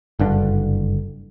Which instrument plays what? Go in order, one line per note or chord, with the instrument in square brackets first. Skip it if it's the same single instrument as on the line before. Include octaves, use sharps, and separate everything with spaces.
[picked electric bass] F#1 G2 D3